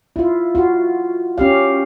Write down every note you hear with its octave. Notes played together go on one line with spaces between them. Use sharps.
E4 F4
F4 F#4
C#4 G4 F5